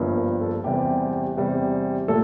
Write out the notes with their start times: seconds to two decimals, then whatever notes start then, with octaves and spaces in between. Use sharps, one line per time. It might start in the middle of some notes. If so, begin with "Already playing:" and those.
Already playing: G1 G2 F3 A#3
0.16 A#4
0.41 A4
0.64 E2 C3 G3 G4
1.36 E2 C3 G3
2.08 A#2 A3 A4